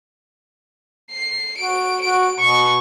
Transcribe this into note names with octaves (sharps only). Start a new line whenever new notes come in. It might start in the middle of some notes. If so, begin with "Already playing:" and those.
C7
F#4 D7
F#4 D7
B2 C#6